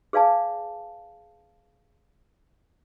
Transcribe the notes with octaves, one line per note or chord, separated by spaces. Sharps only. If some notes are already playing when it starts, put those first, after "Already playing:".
G#4 B4 D5 F5 G#5 A5